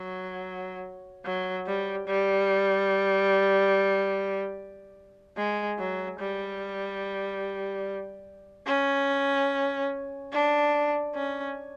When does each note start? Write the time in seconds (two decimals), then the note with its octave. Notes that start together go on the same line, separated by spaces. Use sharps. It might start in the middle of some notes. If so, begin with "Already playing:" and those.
Already playing: F#3
1.25 F#3
1.66 G3
2.08 G3
5.37 G#3
5.79 F#3
6.20 G3
8.67 C#4
10.33 D4
11.15 C#4